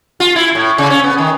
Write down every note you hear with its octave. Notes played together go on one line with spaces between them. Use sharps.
F4
E4
A2
C#3
C#4
B3
D#3